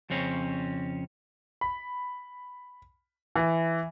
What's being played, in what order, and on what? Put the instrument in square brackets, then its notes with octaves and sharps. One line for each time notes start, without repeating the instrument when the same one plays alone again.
[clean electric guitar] F2 C#3 C4 C#4
[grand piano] B5
E3